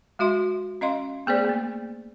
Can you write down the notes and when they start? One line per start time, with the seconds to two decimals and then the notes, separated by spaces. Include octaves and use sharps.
0.19 G#3 F#4 E5 C6
0.81 C#4 D#5 F5 C6
1.26 A3 B3 G#4 C5 D5
1.45 A#3 B3